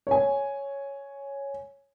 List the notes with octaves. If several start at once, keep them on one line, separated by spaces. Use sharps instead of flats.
C#5 G#5